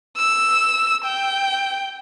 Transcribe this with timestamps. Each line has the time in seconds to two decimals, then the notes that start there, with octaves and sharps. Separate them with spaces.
0.18 E6
1.05 G5